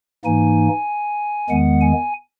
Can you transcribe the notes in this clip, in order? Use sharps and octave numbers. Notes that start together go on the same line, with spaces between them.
G#2 E3 A#3 D#4 G#5
E2 D#3 G#3 B3 F#5
G#5